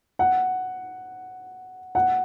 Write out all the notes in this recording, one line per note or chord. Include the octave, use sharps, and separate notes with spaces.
F#5
F#5